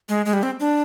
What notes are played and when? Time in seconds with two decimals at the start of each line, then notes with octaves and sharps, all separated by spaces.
0.09 G#3
0.26 G#3
0.33 G3
0.43 C4
0.60 D4